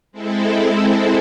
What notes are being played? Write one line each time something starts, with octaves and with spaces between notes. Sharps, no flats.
G#3 C4 E4 A4